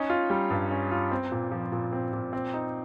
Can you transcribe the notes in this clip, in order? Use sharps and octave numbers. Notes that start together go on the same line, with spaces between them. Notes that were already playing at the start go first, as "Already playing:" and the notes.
Already playing: C#4 D#4
F4
G3
G2
C#4
F4
C4
A#2
F3
A#2
C4
A#2
C4
D#4